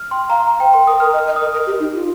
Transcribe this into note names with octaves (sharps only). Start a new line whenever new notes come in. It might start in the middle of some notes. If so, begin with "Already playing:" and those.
Already playing: F6
G5 C6
F5 A#5
A#5
C5 G5
A#4 C6
A#4 D#6
A#4 F6
D#5
F6
D#5
A#4 D#6
A#4
G4
D#4
F4